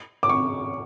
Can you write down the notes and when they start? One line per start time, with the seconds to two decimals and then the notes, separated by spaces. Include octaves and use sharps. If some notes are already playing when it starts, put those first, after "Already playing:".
0.23 D6
0.29 C#6